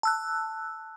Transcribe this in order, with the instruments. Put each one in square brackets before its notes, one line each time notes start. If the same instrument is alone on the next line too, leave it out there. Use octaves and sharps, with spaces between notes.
[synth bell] A5 E6 F#6